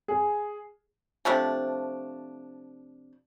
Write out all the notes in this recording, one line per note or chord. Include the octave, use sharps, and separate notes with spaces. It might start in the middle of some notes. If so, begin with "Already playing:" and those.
G#4
C3 F3 A3 D4